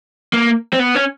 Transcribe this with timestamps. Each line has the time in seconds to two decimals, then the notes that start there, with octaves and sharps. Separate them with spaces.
0.33 A#3
0.73 C4
0.80 B3
0.96 C#4